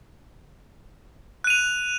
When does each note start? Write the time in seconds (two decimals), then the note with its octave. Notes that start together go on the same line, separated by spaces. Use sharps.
1.44 F#6
1.47 D#7
1.50 F7